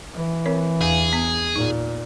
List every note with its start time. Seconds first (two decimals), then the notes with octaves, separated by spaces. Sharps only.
0.14 E3
0.46 C4 A#4 C#5
0.81 E2 G#4 F5 G#5
1.13 B3
1.56 A#2 D#4